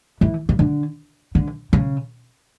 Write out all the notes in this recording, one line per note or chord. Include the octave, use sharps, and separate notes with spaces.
E3
C#3
D3
D3
C#3